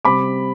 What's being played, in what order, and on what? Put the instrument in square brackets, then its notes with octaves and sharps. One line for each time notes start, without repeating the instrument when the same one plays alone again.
[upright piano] C3 G3 C4 B5 D6